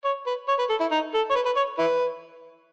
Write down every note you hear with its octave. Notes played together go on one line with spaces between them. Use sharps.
C#5
B4
C#5
B4
A4
E4
D#4
A4
C#5
B4
B4
C#5
E4 B4